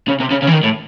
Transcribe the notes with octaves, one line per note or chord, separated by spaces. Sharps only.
C#3
C3
C#3
C#3
E3
D#3
A2